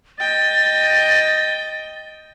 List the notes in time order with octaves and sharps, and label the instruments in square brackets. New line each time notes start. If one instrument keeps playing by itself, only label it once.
[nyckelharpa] D#5 G5 [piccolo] A6